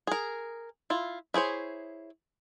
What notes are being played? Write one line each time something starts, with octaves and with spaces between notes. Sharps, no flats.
G#4 A#4
E4 F4
E4 G#4 C5 C#5